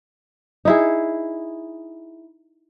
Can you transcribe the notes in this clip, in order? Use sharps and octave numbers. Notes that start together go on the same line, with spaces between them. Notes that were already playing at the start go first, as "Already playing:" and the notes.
D#4 E4 G#4